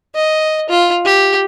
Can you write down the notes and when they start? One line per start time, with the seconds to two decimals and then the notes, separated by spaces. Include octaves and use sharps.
0.15 D#5
0.69 F4
1.05 G4